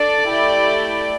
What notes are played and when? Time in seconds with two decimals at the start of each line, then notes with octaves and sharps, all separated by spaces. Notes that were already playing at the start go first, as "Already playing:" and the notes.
Already playing: D4 A4 D5
0.26 A3 E4 G4